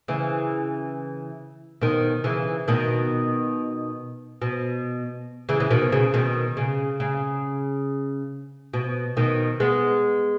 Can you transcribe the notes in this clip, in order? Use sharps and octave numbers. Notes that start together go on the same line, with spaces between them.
C#3 E3
B2 D#3
C#3 E3
B2 D#3
B2
C#3 E3
C#3
B2 D#3
C#3
B2 D#3
C#3
C#3
B2
B2 D#3
G#3 B3